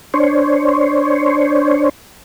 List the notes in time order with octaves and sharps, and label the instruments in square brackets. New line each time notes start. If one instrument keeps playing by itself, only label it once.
[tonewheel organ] D4 C5 C#5